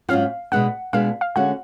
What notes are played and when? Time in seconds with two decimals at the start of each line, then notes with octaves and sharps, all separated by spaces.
0.09 G#2 F#3 C#4 F4 F5
0.52 B2 G#3 B3 D4 F#5
0.93 B2 G#3 B3 D4 F5
1.21 F5
1.36 D3 G#3 C#4 F#4 F#5